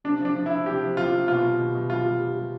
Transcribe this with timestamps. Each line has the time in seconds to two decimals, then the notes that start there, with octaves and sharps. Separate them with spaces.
0.04 C3 D4
0.20 F3 D4
0.36 F3
0.46 E4
0.51 F3
0.66 C3 G4
0.81 F3
0.97 C3 F4
1.13 C3
1.28 B2 F4
1.43 G3
1.59 B2
1.75 B2
1.90 G3 F4
2.05 G3
2.20 G3
2.36 G3